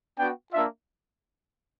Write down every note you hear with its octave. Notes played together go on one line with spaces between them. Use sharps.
B3 D4 F#4 G5
A#3 D4 F4 E5